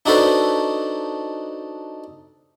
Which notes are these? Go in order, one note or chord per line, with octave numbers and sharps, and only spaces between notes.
D4 D#4 F#4 A4 B4 C5